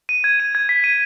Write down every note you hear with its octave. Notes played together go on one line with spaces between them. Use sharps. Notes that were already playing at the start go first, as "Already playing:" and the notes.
D#7
G#6
D#7
G#6
B6
D#7